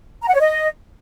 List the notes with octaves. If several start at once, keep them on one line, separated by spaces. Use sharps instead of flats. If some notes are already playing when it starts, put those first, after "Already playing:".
A#5
F#5
C#5
D#5